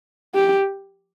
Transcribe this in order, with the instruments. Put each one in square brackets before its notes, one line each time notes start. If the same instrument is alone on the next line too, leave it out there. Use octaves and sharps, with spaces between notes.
[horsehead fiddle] G4